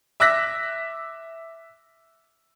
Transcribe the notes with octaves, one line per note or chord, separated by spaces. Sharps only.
E5 D6 E6 F#6 A#6 B6